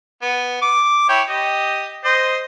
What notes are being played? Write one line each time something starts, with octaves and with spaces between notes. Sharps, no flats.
B3
D6
E4 C#5 G5
G4 D#5
C5 D#5